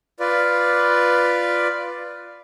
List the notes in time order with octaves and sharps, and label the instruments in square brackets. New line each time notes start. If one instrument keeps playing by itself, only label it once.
[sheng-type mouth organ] F4 B4 D5